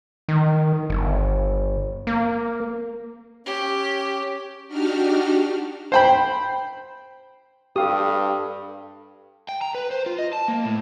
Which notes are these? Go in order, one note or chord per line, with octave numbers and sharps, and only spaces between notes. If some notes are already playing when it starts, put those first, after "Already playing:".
D#3
G1
A#3
C#4 G4
D4 D#4 F#4 G4 F6
C5 G5 B5
G2 G4 A4 F5 D#6
G5
A#5
B4
C5
F4
D#5
A5
A#3
A2